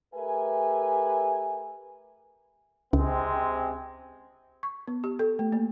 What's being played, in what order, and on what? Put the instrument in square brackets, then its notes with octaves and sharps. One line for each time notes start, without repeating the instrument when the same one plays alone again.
[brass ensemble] A3 G4 A#4 B4 E5 G#5
[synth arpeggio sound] C#2 [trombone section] C3 G#3 C4
[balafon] C#6
B3
G4
A4
A3
A#3